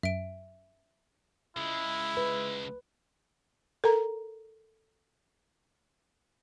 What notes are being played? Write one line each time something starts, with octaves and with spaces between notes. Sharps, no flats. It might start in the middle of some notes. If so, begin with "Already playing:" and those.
F#2 E5 D7
C#2 G#3 E4
B4
A4 A#4 A#5